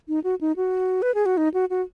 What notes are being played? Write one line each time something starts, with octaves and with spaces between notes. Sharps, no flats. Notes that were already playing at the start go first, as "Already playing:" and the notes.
D#4
F#4
D#4
F#4
B4
G#4
F#4
D#4
F#4
F#4